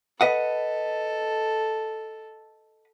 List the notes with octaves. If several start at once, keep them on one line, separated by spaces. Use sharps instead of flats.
A4 B4 D#5 F#5